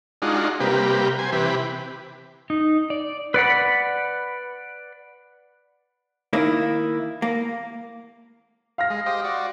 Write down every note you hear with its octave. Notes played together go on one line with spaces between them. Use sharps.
G#3 D4 D#4 F4 F#4
C3 G3 A#3 G4 B4
C5 G#5
C3 E3 G4 B4
D#4
D5
B4 D5 F#5 B5
D#3 A#3 D#4 E4
A#3
F5 F6 A#6
G#3
G4 C5 D#5
F#4 D5